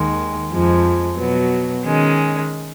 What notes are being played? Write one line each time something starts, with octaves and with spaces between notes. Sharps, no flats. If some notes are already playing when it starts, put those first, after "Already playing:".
Already playing: D#2 D#3 G#3
F2 F3 G#3
B2 F#3 B3
D#3 G#3 C#4